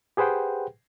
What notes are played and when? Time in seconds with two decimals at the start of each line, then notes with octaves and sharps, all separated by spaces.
0.17 G4 G#4 B4 C5 F#5 G5